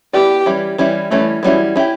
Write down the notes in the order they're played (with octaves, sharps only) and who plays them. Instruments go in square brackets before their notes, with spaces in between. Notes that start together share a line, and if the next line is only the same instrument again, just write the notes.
[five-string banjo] B3 E4 B4 D5 [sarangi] G4
[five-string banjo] E3 G3 C#4 E4
E3 G3 C#4 E4
[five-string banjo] E3 G3 C#4 E4 [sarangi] A3
[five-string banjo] E3 G3 C#4 E4 [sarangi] F#3
[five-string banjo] C#4 E4 G4